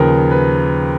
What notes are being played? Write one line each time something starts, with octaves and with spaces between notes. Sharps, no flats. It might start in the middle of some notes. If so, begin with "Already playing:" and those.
Already playing: D#2 C#3 F3 A#4 B4
B4